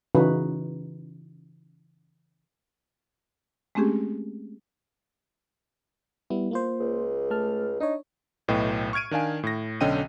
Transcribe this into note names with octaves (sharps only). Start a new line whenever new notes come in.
C#3 E3 D#4 F#4 B4
G#3 A3 C4 C#4 G4 G#4
G3 B3 E4
A#3 F4 C5
C#2
A3 A5 F6
D4 D#4 C#5
B1 A2 B4 D#5 G5
C#6 F6 G#6 D7 D#7
D#3 D4 F5 G#5
A2 A#6
B1 D3 C#4 D#5 G5 D#7